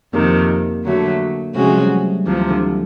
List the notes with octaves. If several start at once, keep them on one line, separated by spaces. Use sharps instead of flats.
F2 C3 D#3 A#3
D3 F#3 A3
C3 F3 G#3 A3 C#4 F#4
G3
F#3
D2 C3 E3 F3
D3